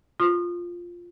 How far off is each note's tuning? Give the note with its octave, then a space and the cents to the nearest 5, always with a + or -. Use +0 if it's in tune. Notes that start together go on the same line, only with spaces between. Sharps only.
F4 +0 C6 +45 D#6 -35